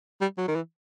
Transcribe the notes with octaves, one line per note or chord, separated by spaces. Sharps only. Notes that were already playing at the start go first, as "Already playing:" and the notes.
G3
F#3
D#3
E3